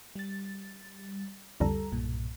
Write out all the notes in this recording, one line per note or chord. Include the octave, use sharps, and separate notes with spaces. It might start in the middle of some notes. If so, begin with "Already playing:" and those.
G3 A6
C2 F2 D3 G3 A4 A#5
B1 G2 A#2